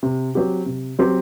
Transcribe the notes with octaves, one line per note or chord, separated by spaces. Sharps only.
C3
F#3 C4 G4
C3
F#3 C4 G4